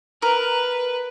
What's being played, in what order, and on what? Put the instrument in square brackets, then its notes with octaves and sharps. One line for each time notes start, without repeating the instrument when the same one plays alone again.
[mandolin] A#4 [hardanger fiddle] B4